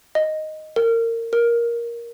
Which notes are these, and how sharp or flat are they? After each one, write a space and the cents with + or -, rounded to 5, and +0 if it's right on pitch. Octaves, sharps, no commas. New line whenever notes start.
D#5 +0
A#4 -25
A#4 +10